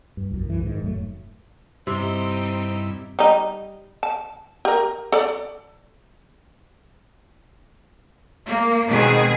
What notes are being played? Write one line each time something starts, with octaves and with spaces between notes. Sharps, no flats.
G2
C2 F#2
C2 F#2 E3
G#2 D#3
F1 G#2 F#3 A3
G2 C3 C4 D#4 E4
G3 D#4
A5
G4 A#4
A4 D5
A#3
B2 D#3 G#3 C4 G#4